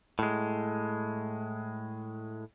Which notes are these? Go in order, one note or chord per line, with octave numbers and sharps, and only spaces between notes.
A2 G#3